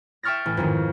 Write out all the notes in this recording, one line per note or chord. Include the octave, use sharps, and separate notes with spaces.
E5 G5 C#6 F6 A6 A#6
A1
F2 G#2 D#3